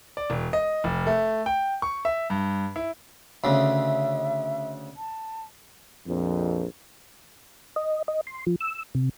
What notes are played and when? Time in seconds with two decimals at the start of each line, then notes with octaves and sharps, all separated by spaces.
0.17 D5
0.30 E1
0.53 D#5
0.84 F1
1.07 A3
1.46 G5
1.82 C#6
2.05 E5
2.30 G2
2.76 E4
3.44 D2 C#3 E5
4.97 A5
6.07 A#1 F2
7.76 D#5
8.08 D#5
8.27 C6
8.47 F3
8.61 E6
8.95 C3